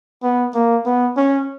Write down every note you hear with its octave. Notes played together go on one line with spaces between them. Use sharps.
B3
A#3
B3
C#4